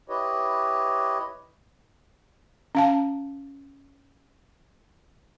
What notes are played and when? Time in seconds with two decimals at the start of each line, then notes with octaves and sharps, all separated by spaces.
0.09 E4 G4 B4 C#5 D#5
2.75 C#4 F5 A5